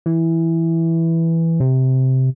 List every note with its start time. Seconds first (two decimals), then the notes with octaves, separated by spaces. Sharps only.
0.06 E3
1.60 C3